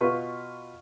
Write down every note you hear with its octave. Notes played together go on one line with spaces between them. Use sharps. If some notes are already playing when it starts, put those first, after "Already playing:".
B2 F4 B4 C#6